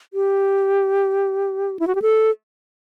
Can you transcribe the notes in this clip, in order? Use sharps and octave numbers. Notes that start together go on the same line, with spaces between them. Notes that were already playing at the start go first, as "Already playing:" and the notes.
G4
E4
F#4
G4
A4